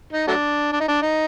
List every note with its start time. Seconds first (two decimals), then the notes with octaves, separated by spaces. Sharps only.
0.13 D#4
0.28 F#3 A3 D4
0.72 D4
0.80 D#4
0.88 D4
1.02 D#4